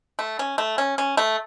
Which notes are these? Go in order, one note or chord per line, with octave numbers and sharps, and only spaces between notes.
A3
C#4
A3
C#4
C#4
A3